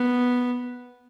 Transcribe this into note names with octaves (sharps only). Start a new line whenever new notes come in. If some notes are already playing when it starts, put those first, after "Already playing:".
Already playing: B3